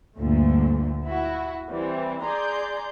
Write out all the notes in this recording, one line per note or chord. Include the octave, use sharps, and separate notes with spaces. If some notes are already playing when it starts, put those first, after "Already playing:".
D2 G2 A#2 D3 A3
E4 F#4
E3 G3 C4
G#4 D5 A#5 C6 G6